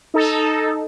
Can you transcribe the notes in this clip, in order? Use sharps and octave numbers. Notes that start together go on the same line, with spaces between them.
D#4 A4